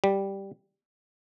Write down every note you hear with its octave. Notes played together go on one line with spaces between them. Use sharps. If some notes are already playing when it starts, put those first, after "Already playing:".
G3